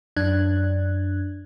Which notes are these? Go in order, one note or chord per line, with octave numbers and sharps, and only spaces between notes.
F#2 D4 F#6 G#6